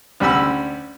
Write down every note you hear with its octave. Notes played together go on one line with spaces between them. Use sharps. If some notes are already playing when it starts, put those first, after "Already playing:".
D2 G3 C#4 B5 E6